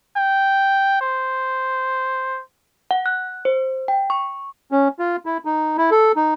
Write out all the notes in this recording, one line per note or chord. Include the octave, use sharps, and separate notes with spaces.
G5
C5
F#5
F#6
C5
G5
C#6
C#4
F4
E4
D#4
E4
A4
D#4